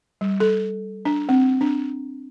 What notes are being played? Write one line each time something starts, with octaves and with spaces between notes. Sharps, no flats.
G3
A4
D4
C4
D4